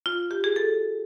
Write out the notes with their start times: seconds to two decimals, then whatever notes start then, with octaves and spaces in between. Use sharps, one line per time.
0.06 F4
0.31 G4
0.44 G#4
0.56 A4